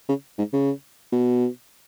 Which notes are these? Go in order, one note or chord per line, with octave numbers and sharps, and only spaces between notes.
C#3
G#2
C#3
B2